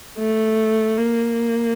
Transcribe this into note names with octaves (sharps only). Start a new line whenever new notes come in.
A3
A#3